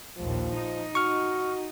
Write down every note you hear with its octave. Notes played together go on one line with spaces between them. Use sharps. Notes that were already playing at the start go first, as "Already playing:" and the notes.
A#1 D#2 F3
D#4
F#4 C#6 F6